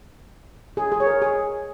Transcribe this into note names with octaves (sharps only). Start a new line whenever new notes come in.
G#4
G#4
C#5
A#4
G#4